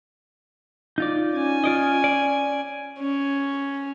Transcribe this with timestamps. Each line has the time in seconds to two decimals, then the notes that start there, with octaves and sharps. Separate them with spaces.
0.98 D#4 F4 D5
1.33 C#4 G#5
1.64 F4 D5 D#5
2.04 D5
2.99 C#4